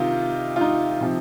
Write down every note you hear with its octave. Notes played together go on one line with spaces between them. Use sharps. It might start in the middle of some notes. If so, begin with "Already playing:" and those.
Already playing: C3 D#3 D#4 F4
F4
D#4
C3 F3